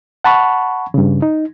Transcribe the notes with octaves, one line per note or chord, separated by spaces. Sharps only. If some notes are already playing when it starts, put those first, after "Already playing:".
F#5 A5 B5 C#6
G2 C#3
D#4